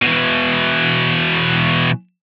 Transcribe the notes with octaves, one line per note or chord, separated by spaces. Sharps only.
B2 E3